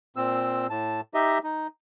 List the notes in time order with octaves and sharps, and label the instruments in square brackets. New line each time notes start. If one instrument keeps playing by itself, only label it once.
[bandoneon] A#2 C4 E6
A2 A5
D#4 G4 D#5 E5
D#4